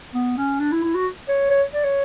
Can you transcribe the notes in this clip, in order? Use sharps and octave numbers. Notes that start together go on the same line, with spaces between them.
B3
C#4
D4
E4
E4
F#4
C#5
C#5
D5
C#5